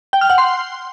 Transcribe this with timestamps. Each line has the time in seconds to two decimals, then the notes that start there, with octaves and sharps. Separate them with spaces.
0.13 G5
0.21 F6
0.30 F#5
0.38 C6